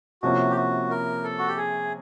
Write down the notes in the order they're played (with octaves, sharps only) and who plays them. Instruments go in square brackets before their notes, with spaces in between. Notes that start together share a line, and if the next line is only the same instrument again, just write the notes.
[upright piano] C3 F3 A#3 C#4 E4 [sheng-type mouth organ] F#4
[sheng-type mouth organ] G4
F#4
A#4
A4
F#4
G4
G#4